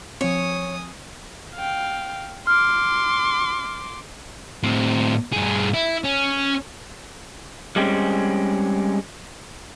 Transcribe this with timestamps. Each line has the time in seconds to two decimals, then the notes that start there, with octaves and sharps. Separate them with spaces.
0.21 F3 C4 C#5 G#5 D#6
1.55 F5 G5
2.47 C6 D6 F6
4.63 A2 C4
5.33 G2 G#4
5.74 E4
6.04 C#4
7.76 G3 G#3 C4 C#4